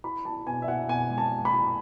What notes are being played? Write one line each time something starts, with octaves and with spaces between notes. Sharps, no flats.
E4 B5
E4 A5
B2 G#5
E5
E4 F#5
B2 G#5
G#3
A5
G#3
B5
E4